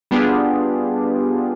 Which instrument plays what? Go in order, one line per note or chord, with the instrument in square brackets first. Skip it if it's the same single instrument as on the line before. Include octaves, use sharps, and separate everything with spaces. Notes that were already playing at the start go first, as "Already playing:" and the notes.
[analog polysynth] G3 B3 D4 F4 G4 G#4